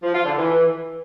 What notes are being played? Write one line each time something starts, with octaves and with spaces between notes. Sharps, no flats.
F3
F4
D3
E3